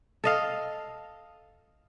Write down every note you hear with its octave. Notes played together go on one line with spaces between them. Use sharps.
A4 D#5 F5